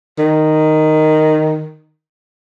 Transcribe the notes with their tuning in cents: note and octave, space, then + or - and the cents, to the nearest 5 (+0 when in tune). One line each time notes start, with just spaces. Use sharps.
D#3 -5